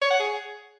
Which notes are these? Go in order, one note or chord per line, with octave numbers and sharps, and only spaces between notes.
C#5
F#5
G#4